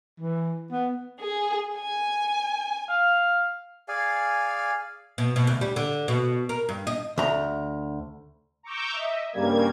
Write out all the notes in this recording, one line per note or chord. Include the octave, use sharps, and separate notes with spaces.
E3
B3
G#4
G#5
F5
G#4 D5 F5 G#5
B2
B2
D2
G3
D3
B2
A#4
G2
D#5
D2 A#5
A#5 C#6 D6 E6 G6
D#5 E5
G2 C#3 G3 A#3 G#6